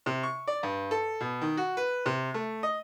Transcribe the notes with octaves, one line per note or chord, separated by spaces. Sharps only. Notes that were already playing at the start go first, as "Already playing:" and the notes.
C3
C#6
D5
G2
A4
B2
D#3
F#4
B4
C3
A3
D#5